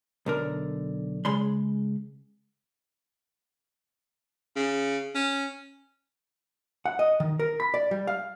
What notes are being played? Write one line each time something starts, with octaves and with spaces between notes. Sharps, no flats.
B1 D3 A#4
C#3 G#3 B5 C6
C#3
C#4
F#5
D#5
D#3
A#4
B5
D5
G3
F5